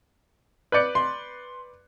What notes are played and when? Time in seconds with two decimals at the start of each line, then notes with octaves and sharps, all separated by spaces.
0.72 B4 D5 F#6 G6 C#7
0.95 C6